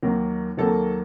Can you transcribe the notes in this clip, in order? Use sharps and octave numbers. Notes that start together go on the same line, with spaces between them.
D#2 D#3 F#3 A#3
D#2 D#3 F#3 A#3 A4